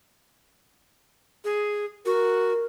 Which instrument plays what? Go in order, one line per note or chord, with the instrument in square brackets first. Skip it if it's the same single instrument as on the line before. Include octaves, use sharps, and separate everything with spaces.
[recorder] G#4
[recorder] F#4 [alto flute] A#4